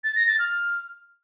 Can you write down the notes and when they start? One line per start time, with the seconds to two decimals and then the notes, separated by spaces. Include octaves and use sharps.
0.04 A6
0.16 A#6
0.27 A6
0.39 F6